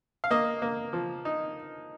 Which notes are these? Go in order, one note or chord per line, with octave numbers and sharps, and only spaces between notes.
F5
A#3 D#5
A#3
F3
D#4